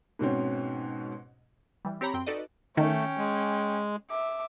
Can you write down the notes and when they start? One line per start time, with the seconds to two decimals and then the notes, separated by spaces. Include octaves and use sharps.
0.19 G#2 B2 C4 C#4
1.85 E3 G3
2.01 C4 G4 C#5 A#5 B5
2.14 F#2 C4 G5 C6
2.26 D#4 F#4 A4 B4 D5 D#5
2.77 D#3 A3 C#4 G5
3.17 G#3
4.10 E5 D6